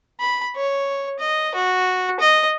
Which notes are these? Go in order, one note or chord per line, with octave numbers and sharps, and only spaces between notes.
B5
C#5
D#5
F#4
D#5